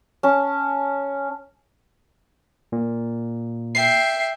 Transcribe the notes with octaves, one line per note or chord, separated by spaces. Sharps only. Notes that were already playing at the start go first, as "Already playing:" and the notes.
C#4 A5
A#2
E5 G5 C7